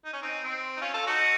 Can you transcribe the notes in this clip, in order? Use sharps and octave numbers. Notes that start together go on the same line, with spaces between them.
D#4
C#4
C4 D#4
C4
D#4
C#4 F4
F4 A4
D#4 F#4